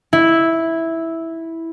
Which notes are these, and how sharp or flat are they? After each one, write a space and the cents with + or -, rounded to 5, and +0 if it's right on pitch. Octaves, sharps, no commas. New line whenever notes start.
E4 -5